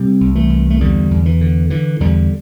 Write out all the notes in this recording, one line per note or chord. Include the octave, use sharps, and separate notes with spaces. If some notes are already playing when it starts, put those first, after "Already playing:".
Already playing: C3 G3 C4
C2
E3 A3
C2
A3
E2 D3 G3
E2
E3
D3
D3 E3
E2 D3 G3